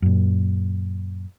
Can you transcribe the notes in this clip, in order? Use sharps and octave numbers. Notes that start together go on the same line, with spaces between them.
F#2 A#2